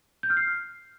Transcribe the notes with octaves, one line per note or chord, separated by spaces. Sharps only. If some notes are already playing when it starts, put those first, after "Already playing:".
G6
F6
C7